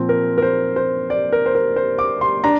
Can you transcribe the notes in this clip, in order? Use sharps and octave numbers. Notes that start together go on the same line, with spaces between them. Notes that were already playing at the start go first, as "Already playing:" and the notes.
Already playing: A#2 F3 C4
A#4
A#4
C5
C5
D5
A#4
C5
A#4
C5
D6
C6
D4 A#5